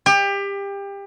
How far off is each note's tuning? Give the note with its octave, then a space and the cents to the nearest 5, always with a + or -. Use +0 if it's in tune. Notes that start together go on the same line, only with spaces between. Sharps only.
G4 +25